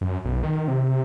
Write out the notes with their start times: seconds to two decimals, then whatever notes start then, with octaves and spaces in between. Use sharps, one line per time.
0.01 F#2
0.25 B1
0.43 D#3
0.68 C3
0.89 C3